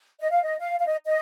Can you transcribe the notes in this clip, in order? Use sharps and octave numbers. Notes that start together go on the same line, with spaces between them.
D#5
F5
D#5
F5
F5
D#5
D#5